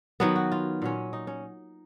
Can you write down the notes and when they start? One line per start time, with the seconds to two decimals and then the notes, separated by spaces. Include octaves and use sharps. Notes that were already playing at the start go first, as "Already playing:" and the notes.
0.20 D#3 F#3 B3 B4
0.36 F#4
0.52 F4
0.82 A#2 F#3 C#4
1.13 D#4
1.27 C#4